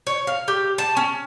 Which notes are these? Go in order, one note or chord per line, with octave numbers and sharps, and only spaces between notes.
C#5
F5
G4
A5
C#4